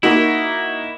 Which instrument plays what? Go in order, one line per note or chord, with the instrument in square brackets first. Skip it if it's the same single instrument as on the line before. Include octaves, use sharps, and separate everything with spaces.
[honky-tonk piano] A#3 D#4 F#4 [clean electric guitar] E4